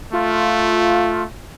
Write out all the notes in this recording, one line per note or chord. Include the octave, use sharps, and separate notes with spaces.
A3 F4